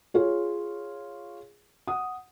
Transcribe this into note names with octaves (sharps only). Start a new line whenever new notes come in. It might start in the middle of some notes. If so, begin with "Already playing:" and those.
F4 G#4 C#5
F#5 D#6